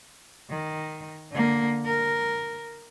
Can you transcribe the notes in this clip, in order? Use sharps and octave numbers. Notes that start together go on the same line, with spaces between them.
D#3
D3 A#3
A#4